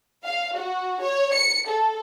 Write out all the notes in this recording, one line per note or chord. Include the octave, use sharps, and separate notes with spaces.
F5
F#4
C#5
C#7
A4